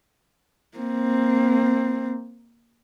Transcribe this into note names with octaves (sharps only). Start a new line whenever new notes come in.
A#3 C4